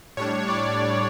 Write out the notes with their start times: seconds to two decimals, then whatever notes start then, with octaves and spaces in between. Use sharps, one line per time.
0.17 A2 G3 D4 C#5
0.48 D5